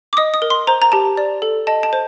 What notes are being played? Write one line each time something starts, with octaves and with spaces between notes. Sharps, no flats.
D6
D#5 D#6
D#6
A#4
C6
C5 A#5
A#5
G4 A5
D5
A4
D#5 A5
A5
C5